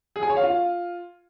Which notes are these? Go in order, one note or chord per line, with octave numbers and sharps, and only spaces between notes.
G#4
G#5
C#5
F5
F4